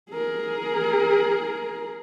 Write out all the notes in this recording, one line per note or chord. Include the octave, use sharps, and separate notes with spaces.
G#4 A#4